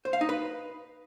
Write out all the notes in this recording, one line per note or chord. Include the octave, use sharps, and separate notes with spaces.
C5
F5
D#4
B4